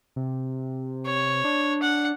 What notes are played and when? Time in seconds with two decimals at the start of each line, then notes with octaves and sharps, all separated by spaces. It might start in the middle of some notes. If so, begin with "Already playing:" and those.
0.16 C3
1.06 C#5
1.44 D4
1.82 F#5